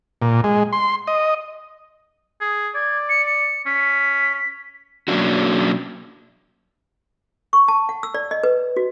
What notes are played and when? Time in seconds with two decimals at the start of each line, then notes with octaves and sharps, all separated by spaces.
0.22 A#2
0.44 G#3
0.73 C6
1.07 D#5
2.41 G#4
2.75 D5 G#6
3.09 C#7
3.26 C#7
3.66 C#4 B6
5.08 B2 F#3 A#3 C#4 D4 F#4
7.53 C#6
7.68 A5
7.89 F#5
8.03 E6
8.14 D5
8.31 D#5
8.44 B4
8.77 F#4